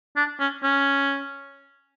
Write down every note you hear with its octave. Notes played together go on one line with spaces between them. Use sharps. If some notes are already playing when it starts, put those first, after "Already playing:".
D4
C#4
C#4